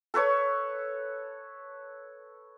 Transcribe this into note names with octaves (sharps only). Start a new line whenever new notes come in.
A4 B4 C#5 C#6